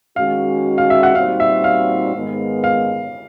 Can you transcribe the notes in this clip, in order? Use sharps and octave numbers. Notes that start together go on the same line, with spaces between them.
D#3 G#3 C#4 F#4 F5
F5
E5
F#5
A#2 G3 C4 D#4 F#4 F5
E5
F5
G#2 D#3 G#3 B3
F5